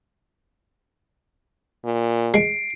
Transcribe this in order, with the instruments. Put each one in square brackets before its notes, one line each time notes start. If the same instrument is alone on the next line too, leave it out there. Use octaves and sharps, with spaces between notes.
[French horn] A#2
[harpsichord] G#3 [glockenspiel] C7 D7